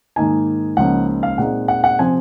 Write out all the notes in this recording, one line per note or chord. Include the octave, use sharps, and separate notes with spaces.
G#2 D#3 A#3 D#4 G#5
C#2 C#3 F3 A#3 D#4 F#5
F5
A#2 G#3 C4 D#4 F#5
F#5
F#5
C3 F3 C4 G#5